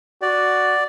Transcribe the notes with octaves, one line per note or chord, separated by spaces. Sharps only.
F#4 D5